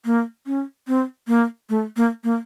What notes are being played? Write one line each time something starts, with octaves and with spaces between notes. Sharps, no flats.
A#3
C#4
C4
A#3
A3
A#3
A#3